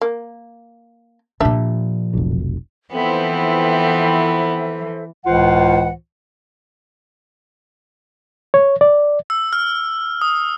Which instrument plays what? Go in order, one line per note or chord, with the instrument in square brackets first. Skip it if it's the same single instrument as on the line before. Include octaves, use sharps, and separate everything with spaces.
[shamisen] A#3
[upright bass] A#2 F3 [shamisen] G3 D4 E5
[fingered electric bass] F1 B1
[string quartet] E3 [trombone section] F3 C4 [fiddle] B3 E4 [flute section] A4 C5 E5
[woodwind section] C#2 A2 E3 F4 C5 F#5
[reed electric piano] C#5
D5
[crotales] E6
F6
D#6